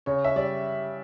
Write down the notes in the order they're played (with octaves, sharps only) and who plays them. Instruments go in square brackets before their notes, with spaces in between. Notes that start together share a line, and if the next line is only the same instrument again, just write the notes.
[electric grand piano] C#3 [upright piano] C#5
[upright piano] E5
[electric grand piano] G3 [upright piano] D5